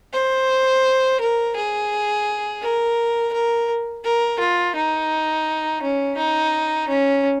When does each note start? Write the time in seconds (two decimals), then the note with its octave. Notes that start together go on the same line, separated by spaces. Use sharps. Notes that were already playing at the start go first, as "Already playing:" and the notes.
0.13 C5
1.20 A#4
1.56 G#4
2.62 A#4
3.33 A#4
4.04 A#4
4.40 F4
4.75 D#4
5.82 C#4
6.17 D#4
6.88 C#4